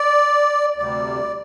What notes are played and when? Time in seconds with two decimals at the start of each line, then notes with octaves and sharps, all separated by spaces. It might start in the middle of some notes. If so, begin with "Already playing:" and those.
Already playing: D5
0.77 D2 C3 G3 D5